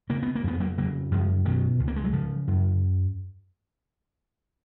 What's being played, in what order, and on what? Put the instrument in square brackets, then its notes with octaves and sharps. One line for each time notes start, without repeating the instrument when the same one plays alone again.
[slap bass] C#3 A#3
B3
A#3
F2 B3
F#3 A#3
C#3 F#3 A#3
F#2 F3 G#3
B2 D#3 F#3
C#2
A#3
G#3
F#3
C#3 F3
F#2